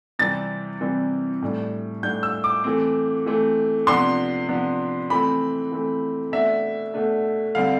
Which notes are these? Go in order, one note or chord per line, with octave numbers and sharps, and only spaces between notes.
C3 E3 G3 C4 A6
C3 E3 G3 C4
A2 G3 D4
A2 G3 D4 G6
E6
D6
E3 A3 C4
E3 A3 C4
C3 F3 B3 D4 C6
C3 F3 B3 D4
E3 A3 C4 B5
E3 A3 C4
B2 A3 D4 E5
B2 A3 D4
D3 G3 C4 F5